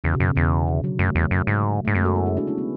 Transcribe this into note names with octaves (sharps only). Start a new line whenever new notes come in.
E2 C#3
B2
F#2 C#3
E2 C#3
D3
F#3
F#2 A3
E2
F#2
G#2
G#2 A3
F#2 G#3 B3
F#4 A4
E4 G#4
E4 G#4
D4 F#4
C#4 E4
B3 D4